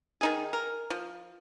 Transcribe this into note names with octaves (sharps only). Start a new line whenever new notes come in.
D#3 D#4 G#4
A#4
F3